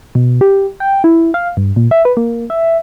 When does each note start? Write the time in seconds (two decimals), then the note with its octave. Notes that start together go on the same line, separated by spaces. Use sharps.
0.15 B2
0.41 G4
0.80 G5
1.04 E4
1.34 F5
1.57 G2
1.76 A#2
1.91 E5
2.05 B4
2.17 A#3
2.50 E5